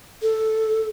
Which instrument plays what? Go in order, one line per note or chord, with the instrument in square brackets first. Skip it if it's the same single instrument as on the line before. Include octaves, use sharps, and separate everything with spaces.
[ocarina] A4